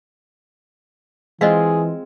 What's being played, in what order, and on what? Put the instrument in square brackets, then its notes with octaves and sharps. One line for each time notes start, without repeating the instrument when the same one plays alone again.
[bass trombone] E3 [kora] G#3 C4 F4 [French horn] G#4 [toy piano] C5 D#5 F5